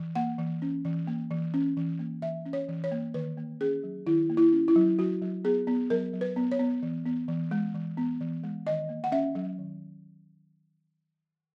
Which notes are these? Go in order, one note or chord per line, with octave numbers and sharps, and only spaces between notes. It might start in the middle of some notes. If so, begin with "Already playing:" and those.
Already playing: E3
A#3 F#5
E3
C#4
E3
A#3
E3
C#4
E3
A#3
E3 E5
C#4
C#5
E3
C#5
A#3
D#3 B4
A#3
C#4 G#4
F#3
D#3 E4
A#3
E4
C#4
E4
F#3
F#3 F#4
F#3
B3 G#4
B3
F#3 A#4
F#3
B4
B3
C#5
B3
E3
B3
E3
G#3
E3
B3
E3
G#3
D#3 D#5
A#3
F#5
C#4 E5
F#3
D#3